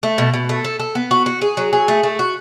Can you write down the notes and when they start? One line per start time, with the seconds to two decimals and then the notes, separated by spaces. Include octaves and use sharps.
0.03 A3
0.18 B2
0.34 B2
0.49 A3
0.64 A4
0.80 A4
0.95 B3
1.11 F#4
1.26 F#4
1.41 G#4
1.57 F#3
1.73 G#4
1.88 A3
2.03 A3
2.19 F#4